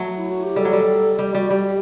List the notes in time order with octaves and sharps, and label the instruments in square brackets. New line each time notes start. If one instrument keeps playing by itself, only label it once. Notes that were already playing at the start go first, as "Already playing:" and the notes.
Already playing: [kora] F#3 A3
[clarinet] E4
F#4
G4
[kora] G3 [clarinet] A4
[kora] F#3
G3
[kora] G3 [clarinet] G4
[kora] G3 [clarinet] F#4
[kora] G3 [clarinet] G4